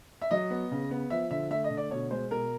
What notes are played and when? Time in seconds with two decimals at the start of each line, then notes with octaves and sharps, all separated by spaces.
0.22 E5
0.31 F#3 D#5
0.50 B3
0.71 C#3
0.91 B3
1.10 F3 E5
1.31 D3 E5
1.50 A3 E5
1.64 D#5
1.71 D3
1.77 D5
1.91 B2 C#5
2.11 G#3 C5
2.31 B2 A#4